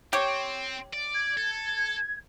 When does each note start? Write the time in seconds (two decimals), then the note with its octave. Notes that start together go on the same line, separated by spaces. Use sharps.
0.13 C4 G4 C#5
0.93 D5
1.15 G#6
1.37 A4